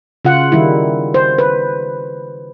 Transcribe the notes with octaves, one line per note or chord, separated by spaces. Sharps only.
C#3 F4 F#5
D#3 G3 E4
C5
B4